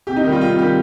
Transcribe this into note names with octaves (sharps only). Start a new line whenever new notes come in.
C3 G4
D#4
D#3
G3 F4
C3 F4
D#3 G3 G4